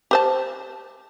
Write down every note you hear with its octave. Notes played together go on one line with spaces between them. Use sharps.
G4 C5 A5